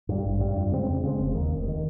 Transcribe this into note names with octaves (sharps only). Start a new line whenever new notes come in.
G2 G3
G#1
G2 G3
F2
C#3 G#3 C4
F2
C#3 G#3 C4
F1
D#2 D#3
F1
D#3